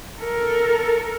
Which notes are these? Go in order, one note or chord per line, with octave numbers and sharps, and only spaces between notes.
A4 A#4